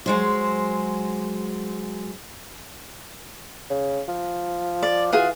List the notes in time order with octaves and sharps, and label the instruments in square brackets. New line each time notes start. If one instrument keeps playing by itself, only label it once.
[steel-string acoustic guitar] F#3 G#3 C5
[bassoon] C#3
F3
[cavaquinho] D5
[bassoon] E3 [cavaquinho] F4 F#4 G#4